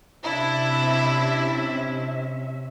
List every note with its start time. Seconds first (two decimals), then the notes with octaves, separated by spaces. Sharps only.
0.23 C3 C#4 D4 E4 E5